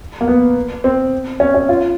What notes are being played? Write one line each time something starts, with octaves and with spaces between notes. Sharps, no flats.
A#3
B3
C4
C#4
C#4
F4